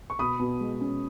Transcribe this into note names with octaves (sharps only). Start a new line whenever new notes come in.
C#6
B2 B5 D#6
B2
G#3
C#4